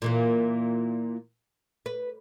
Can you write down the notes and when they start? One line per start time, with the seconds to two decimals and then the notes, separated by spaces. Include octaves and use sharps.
0.02 A#2 E3 A#3
1.86 B4